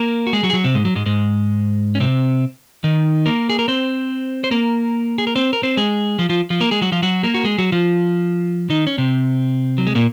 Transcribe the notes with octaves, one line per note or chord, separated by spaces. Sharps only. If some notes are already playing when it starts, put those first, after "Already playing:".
Already playing: A#3 A#4
F#4
G#3 G#4
F#3 F#4
G#4
F#3 F#4
C3 C4
G#2 G#3
F#3
G#2 G#3
G#2 G#3
C#4
C3 C4
D#3 D#4
A#3 A#4
G#4
A#4
C4 C5
C5
A#3 A#4
G#4
A#4
C4 C5
A#4
C4 C5
G#3 G#4
F3 F4
F3 F4
F3 F4
A#3 A#4
G#3 G#4
F#3 F#4
F3 F4
F#3 F#4
A#3 A#4
F#4
G#3 G#4
F#3 F#4
F3 F4
D#3 D#4
C#4
C3 C4
F#3
G#3
A#2 A#3